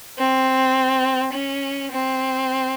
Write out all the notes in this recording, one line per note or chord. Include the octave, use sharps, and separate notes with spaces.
C4
C#4
C4